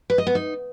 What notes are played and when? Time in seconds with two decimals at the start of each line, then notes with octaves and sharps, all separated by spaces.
0.10 B4
0.18 D#5
0.27 B3
0.35 D#4